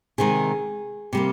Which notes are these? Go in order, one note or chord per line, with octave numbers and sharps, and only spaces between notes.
C3 D#3 G#3 G#4
C3 G3 A#3